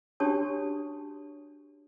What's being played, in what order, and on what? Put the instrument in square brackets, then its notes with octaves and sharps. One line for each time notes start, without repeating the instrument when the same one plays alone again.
[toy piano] D4 F#4 G4 C#5 A5 D#6